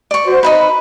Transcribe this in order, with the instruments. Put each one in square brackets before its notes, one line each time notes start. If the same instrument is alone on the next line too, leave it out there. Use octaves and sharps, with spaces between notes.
[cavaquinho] D5 C#6
[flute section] F#4 C5
[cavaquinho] D#4 E4 B4 [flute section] B5